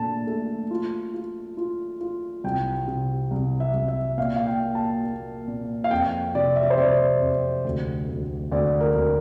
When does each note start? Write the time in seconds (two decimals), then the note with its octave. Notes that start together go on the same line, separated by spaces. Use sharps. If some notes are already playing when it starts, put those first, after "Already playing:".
Already playing: A#2 A3 D4 A5
0.27 A3
0.71 F4
1.14 F4
1.57 F4
2.01 F4
2.44 C2 G5
2.88 C3
3.31 C2
3.60 E5
3.74 C2
3.88 E5
4.18 A#2 F5
4.36 F5
4.47 G5
4.61 A#3
4.75 A5
5.04 A#3
5.47 A#2
5.84 F5
5.91 F2 G5
6.35 C3 D5
6.56 E5
6.63 D5
6.70 C5
6.78 C3 D5
7.21 F2
7.64 D2
8.08 D2
8.52 D2 D5
8.81 A#4
8.95 D2